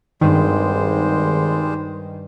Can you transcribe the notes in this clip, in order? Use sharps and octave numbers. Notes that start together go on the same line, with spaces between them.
G#1 G2 D#3 G3 G#3 C5